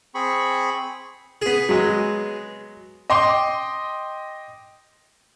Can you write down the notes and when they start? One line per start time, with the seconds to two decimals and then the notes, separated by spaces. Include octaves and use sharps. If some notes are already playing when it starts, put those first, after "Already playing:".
0.15 C4 G#4 B5 C#6
1.42 B3 G#4
1.69 F#3 G#3
3.10 D#5 G5 C6 D6